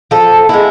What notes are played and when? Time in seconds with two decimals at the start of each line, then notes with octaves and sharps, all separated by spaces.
0.11 F3 A4
0.49 G#3 B3 E4